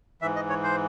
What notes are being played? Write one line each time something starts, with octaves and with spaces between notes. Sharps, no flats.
G#2 E3 E5
D#5
C#5
C5